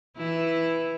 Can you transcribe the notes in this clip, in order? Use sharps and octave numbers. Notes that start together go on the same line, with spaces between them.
E3 E4